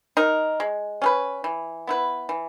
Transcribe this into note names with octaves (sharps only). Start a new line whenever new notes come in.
D#4 A#4
G#3
C#4 G#4 B4
E3
B3 E4 B4
E3